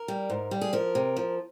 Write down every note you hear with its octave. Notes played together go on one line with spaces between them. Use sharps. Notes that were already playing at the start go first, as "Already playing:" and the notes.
Already playing: A#4
G3
G#2
G3
G#4
F3 A#4
C3
F3